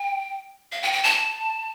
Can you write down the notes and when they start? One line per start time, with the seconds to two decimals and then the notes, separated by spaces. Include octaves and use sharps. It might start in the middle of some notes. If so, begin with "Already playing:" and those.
Already playing: G5
0.72 F5
0.83 G5
0.93 G5
1.04 A5